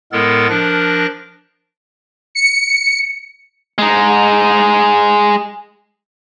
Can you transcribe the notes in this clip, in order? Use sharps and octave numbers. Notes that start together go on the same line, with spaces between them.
A2 G#3 B3 A4 A#4 A6
F3 D4 A#4 F#6 A#6
C#7
G#3 D#4